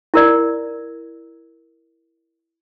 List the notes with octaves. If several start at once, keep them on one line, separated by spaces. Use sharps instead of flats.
E4 A#4 D5